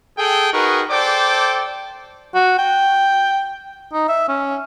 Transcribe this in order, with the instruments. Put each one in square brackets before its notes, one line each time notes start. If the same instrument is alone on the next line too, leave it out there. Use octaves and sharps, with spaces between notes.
[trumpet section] G#4 A4 G5
D#4 F#4 G#4 A#4 B4 C#6
A4 C5 D5 G5 D6
[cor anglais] F#4
G5
D#4
E5
C#4